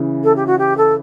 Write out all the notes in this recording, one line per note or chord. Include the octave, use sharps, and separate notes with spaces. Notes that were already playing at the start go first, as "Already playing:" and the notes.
Already playing: C#3 E3
A4
G4
F#4
G4
A4